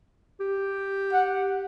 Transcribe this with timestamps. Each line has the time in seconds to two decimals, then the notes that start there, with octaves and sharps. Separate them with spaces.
0.40 G4
1.13 F#5